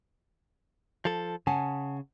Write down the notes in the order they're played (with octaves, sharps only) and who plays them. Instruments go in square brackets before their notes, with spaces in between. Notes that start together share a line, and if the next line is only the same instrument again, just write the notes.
[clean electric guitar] F3 A4
[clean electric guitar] C#3 [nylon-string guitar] F#5 G#5 A5